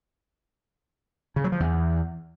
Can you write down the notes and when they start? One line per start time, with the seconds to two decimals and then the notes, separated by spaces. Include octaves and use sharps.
1.36 C#3
1.44 F#3
1.52 F3
1.60 E2